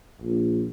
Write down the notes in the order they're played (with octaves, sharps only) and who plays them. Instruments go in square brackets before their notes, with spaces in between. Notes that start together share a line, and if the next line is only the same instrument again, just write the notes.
[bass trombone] A#1